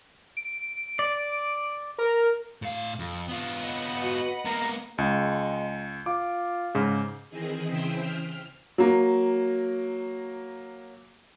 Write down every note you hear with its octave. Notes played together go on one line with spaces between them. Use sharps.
D7
D5
A#4
A2 F5
F2
B3 F4
B4 D#5 F#5
F#4
A#3 B3 A#5
C#2 G#3
F4 D6
G#2 C#3
D#3 E3 C4 D#4 G#4
C#3 E3 G#4 C5 E5 G5
F6
F#3 A#3